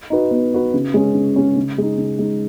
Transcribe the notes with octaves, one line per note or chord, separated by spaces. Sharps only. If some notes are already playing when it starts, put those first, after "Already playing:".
D#4 F#4 B4
B3
D#4 F#4 B4
C#3
G#3 C#4
C#3
G#3 C#4
C#3
G#3 D#4
C#3
G#3 D#4